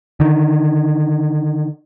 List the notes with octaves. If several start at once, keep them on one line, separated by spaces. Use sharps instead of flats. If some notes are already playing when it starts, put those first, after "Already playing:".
D3 D#3